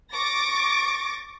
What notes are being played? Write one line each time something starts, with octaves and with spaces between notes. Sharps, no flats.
C#6 D6 A6 A#6